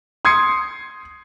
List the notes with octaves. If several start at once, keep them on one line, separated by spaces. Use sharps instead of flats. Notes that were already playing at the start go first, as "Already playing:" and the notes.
C6 D#6 G#6 C7 C#7